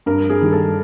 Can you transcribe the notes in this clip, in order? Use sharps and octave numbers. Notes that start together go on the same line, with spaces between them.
G2 A#4
G#4
D#3 G3
A4